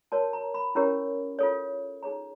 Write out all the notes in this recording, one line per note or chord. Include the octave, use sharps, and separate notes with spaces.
F#4 A#4 C#5 A5
A#5
B5
C#4 E4 G4 A#4 C#5
F4 A4 C#5
D#4 G#4 C#5 A#5